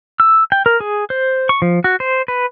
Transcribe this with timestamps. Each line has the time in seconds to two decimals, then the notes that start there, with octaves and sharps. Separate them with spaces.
0.20 E6
0.52 G5
0.66 A#4
0.80 G#4
1.10 C5
1.49 C#6
1.62 F3
1.84 F#4
2.00 C5
2.28 B4